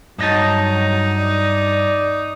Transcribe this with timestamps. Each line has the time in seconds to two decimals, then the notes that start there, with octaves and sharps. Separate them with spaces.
0.18 G2 F#3 D#4 D#5 A5
1.19 D5